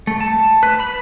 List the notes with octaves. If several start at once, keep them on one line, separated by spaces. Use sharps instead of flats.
A3
A5
B4
B5